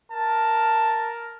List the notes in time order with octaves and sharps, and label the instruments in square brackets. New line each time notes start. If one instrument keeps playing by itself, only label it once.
[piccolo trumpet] A#4 [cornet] A5